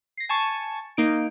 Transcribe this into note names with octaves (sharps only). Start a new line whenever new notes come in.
A#6 C7
G#5 A5 C#6
A#3 D#4 D7